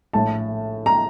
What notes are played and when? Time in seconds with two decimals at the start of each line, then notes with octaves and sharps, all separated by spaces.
0.13 A#1 A2 A3 A5
0.86 A#5